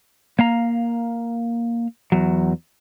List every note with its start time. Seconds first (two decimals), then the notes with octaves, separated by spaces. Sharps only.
0.39 A#3 F5 A#5
2.12 E2 F#3